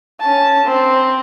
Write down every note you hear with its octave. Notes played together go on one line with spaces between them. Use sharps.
C#4 A5
C4